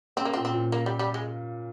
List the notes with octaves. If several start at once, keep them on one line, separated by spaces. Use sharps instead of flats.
C#3 C4
A#3
A#2 C4
C4
A#2
A#3
G3
G3
G#3